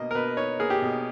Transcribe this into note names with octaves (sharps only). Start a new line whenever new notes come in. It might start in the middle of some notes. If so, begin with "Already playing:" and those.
Already playing: B2 A#3 D#5
A#4
B2 B4
D#4 C#5
A#3 G#4
G4
B2